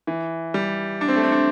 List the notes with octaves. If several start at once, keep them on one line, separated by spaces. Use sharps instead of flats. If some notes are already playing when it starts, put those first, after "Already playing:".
E3
G3
D4
C4
A3
C4
D4